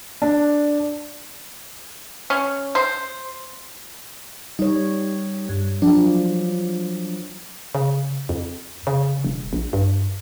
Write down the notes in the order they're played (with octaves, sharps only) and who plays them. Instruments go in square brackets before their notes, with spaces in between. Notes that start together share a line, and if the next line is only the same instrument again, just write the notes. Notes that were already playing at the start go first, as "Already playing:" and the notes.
[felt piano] D4
[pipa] C#4
C5
[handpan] G3 C#5 [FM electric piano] D#4
[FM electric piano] G2
[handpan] F3 F#3 [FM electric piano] D4
[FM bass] C#3
F2
C#3
E1
A#1
G2